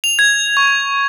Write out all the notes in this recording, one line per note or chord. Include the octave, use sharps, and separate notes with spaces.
F7
G#6
C#6